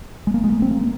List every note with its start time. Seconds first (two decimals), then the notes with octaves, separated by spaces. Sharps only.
0.27 G#3
0.34 A#3
0.44 G#3
0.52 A#3
0.62 C4
0.71 A#3